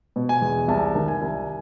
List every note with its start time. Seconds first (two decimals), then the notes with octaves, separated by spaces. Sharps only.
0.16 B2
0.29 G#5
0.42 E2
0.68 C2 A5
0.95 D#3
1.08 G#5
1.21 C2